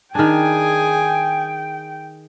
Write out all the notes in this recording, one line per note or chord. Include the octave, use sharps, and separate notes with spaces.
D#3 D4 G#4 G5 G#5